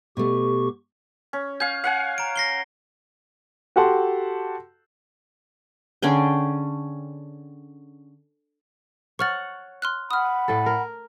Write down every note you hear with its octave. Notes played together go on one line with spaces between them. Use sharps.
B2 A3 G4 C#6
C#4
F5 G#5 G6
F5 F#5 G#5
A#5 D7
A#6 C7 G7
F#4 G4 A4 F#5 A5 C6
D3 C#4 G#4 G5
C#5 F#5 C#6 F6 A6
C6 F6 F#6
F#5 B5 D#6 F6
A2 A4
A#4